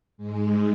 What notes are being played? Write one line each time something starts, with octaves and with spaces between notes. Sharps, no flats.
G#2 G#3